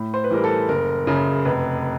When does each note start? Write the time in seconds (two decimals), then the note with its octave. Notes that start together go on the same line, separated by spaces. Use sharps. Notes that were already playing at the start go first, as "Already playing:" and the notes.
Already playing: A2
0.14 C5
0.24 B4
0.31 E3 G3 A#4
0.44 A4
0.69 F#1 A#4
1.07 F#2 C#3
1.45 F1 B4